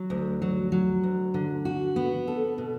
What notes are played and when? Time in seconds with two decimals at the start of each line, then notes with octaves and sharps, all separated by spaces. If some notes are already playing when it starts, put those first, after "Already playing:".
Already playing: F#3
0.10 D2
0.42 F#3
0.72 F#3
1.03 D2
1.34 D3
1.65 F#4
1.96 B3
2.28 A4
2.58 B2